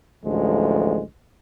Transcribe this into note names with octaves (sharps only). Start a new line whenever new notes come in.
A1 D2 F3 G#3